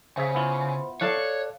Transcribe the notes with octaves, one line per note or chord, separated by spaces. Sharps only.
C#3 G#4 C5 E5 F5
B3 E4 F4
A4 C#5 D5 F5 F#6